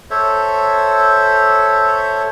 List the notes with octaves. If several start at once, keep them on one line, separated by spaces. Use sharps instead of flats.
A4 C5 C#5 E5